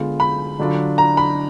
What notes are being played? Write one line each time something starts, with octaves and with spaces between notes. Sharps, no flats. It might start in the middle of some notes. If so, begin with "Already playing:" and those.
Already playing: D3 G#3 B3 F4
B5
D3 F#3 D4 F4
A#5
B5